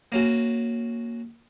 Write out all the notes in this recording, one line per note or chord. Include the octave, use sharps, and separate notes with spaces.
A#3 C#4 F#4